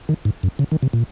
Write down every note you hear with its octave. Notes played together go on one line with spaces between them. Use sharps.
D#3
G#2
F#2
C#3
D#3
C3
A#2